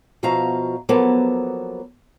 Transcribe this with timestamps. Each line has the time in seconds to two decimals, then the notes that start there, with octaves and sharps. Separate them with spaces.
0.23 B2 F3 F#4 E5 F5 A#5
0.89 F3 F#3 A#3 B3 A4